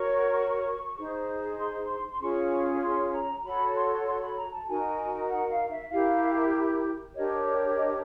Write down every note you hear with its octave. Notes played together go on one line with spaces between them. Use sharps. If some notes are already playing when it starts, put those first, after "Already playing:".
Already playing: F#4 A#4 C#5 C#6
D#4 G#4 C5
C6
C6
C#4 F4 G#4 C#5 C#6
C6
A#5
F#4 A4 C#5 B5
C6
C6
B5
A#5
A5
D#4 F#4 A#4 G#5
F#5
F5
E5
E4 G4 A#4 F5
D4 G4 A#4 C#5 D#5
D#5